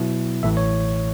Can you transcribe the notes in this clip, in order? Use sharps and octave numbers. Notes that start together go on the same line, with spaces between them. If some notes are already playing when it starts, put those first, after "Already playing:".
Already playing: B2 F#3 B3 E4
A1 A2 E3 E5
C#5